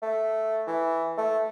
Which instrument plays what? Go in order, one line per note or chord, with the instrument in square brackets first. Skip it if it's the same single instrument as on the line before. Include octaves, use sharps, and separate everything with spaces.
[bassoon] A3
E3
A3